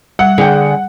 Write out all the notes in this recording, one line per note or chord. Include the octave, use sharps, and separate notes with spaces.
G3 F#5
D3 G#4 G5